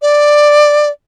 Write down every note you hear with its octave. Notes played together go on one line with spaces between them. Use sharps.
D5